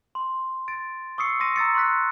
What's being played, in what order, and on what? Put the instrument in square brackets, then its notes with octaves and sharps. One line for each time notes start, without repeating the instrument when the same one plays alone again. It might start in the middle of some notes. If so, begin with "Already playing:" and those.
[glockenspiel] C6
A6 D7
C#6 D#6 E6 C7 C#7
C6 D#6 A#6 D#7
A#5 E6 A6 C#7
C6 C#6 F#6 B6